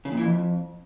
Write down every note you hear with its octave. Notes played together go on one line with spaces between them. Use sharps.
C#3
A#2
E3
F2